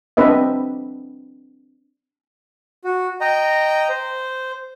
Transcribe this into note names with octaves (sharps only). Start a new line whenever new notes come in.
C4 D4 B4 D#5 E5
F#4
D#5 G5 A#5
C5